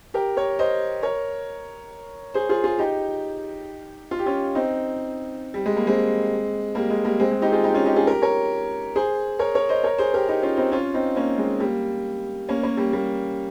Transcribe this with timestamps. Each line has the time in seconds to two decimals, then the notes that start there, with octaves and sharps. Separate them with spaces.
0.14 G4 A#4
0.37 A#4 C#5
0.59 C5 D#5
1.03 A#4 C#5
2.34 G#4 C5
2.49 F4 G#4
2.64 F4 G#4
2.78 D#4 G4
4.11 F4
4.19 G4
4.26 C#4 F4
4.55 C4 D#4
5.54 G3
5.66 G#3
5.77 A#3
5.87 G#3 C4
6.75 G3 A#3
6.90 G#3
7.04 G3 A#3
7.20 G#3 C4
7.31 G#3
7.42 D#4 G4
7.52 F4 G#4
7.64 D#4 G4
7.74 C#4 F4
7.86 D#4 G4
7.96 F4 G#4
8.07 G4 A#4
8.22 A#4 C#5
8.96 G#4 C5
9.39 A#4 C#5
9.55 A#4 C#5
9.69 C5 D#5
9.83 A#4 C#5
9.98 G#4 C5
10.14 G4 A#4
10.28 D#4 G4
10.42 C#4 F4
10.57 C4 D#4
10.72 C#4 F4
10.94 C4 D#4
11.16 A#3 C#4
11.38 G#3 C4
11.60 G3 A#3
12.49 A#3 C#4
12.63 A#3 C#4
12.77 G3 A#3
12.93 G3 A#3